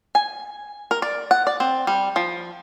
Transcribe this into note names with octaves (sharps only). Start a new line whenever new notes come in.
G#5
A#4
D5
F#5
D5
C4
G3
F3